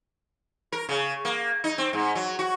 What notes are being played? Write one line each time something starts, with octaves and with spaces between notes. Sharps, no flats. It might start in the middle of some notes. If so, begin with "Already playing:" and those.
A#4
C#3
A#3
D#4
C4
G#2
F#3
F#4